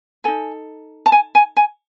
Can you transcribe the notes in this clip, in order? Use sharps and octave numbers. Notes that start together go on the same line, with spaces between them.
D#4 A4 G#5
A5
G#5
G#5
G#5